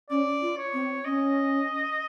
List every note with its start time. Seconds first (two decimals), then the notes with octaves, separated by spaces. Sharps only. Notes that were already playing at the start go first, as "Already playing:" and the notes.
0.10 C#4 D5
0.41 F4
0.57 C#5
0.73 C4
1.05 C#4 D#5